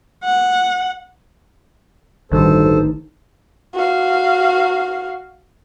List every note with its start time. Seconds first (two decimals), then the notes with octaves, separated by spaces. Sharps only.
0.24 F#5
2.32 A1 D2 G2 D#3 D#4 A4 C5
3.74 F#4 F5